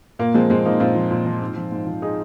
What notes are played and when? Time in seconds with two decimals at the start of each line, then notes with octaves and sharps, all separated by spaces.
0.19 A#2 A#3
0.34 F3 G#3 C4
0.50 A#2 G#3 C4
0.65 F3 A#3 D#4
0.80 A#2 C4 F4
0.95 F3
1.11 A#2
1.26 F3
1.41 G#2
1.56 F3
1.72 G#2
1.87 F3
2.02 D#4 G#4